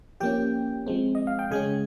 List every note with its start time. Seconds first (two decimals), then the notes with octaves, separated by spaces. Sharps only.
0.20 F3 A#3 C#4 G4 G5
0.87 F3 G#3 C4
1.15 D#5
1.27 F5
1.39 G5
1.51 C#3 G#3 C#4 G#4 G#5